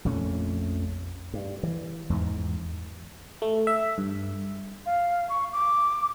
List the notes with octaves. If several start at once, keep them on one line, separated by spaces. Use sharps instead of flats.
A#1 F2 A3 C#4
G2
E3
E2 G#2
A3
E5
G2
F5
C#6
D6